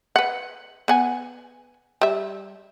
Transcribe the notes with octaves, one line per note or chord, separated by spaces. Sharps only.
B4 F#5
B3 F#5 G#5
G3 E5